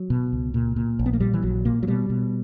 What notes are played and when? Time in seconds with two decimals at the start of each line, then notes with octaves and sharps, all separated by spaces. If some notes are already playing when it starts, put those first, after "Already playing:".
Already playing: F#3
0.10 B2
0.33 C#2
0.54 A#2
0.76 A#2
0.99 A#1
1.06 B3
1.13 A#3
1.20 A#2 G3
1.34 E3
1.42 A#1 F#3
1.65 A#2 A#3
1.83 F#3
1.88 B2 G3
2.10 B2